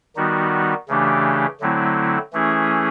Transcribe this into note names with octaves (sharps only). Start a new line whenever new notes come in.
D#3 G3 B3 D#4 F#4
C#3 E3 A3 D4 G4
D3 F#3 A3 C4 E4
E3 A3 C#4 E4 G#4